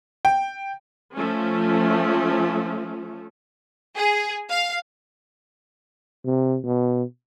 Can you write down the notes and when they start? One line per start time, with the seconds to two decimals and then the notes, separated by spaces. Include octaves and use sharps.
0.25 G5
1.15 F3 A3 C#4
3.96 G#4
4.50 F5
6.25 C3
6.64 B2